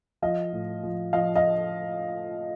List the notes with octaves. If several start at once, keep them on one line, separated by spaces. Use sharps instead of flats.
F3 D#5 F5
A2
F3
F3 D#5 F5
D#5 F5